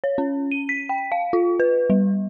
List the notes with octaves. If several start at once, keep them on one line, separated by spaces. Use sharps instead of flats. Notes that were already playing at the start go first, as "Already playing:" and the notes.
C#5
C#4
D#7
B6
G5
F5
F4
B4
G3